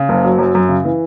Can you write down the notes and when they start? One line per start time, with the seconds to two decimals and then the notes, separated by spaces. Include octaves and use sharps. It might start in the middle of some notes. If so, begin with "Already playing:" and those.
Already playing: C#3
0.09 F#1
0.25 F#3
0.39 F#2
0.55 F#2
0.69 C#3
0.85 E3